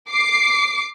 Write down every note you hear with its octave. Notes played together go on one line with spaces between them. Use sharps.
D6 C7